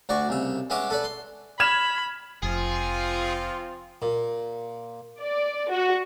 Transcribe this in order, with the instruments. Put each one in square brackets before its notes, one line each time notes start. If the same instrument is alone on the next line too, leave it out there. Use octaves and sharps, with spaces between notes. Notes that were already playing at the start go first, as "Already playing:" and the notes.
[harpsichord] D2 F#4 D5 C#6
C2 C#3 E5
G#3 B3 C#4 E5 D6
A4 B4 D5
C6
[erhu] B5 [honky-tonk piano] F6 G#6 E7
[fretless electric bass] F1 [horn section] F3 C4 F4 [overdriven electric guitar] G#4
[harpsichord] A#2
[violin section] D5
F#4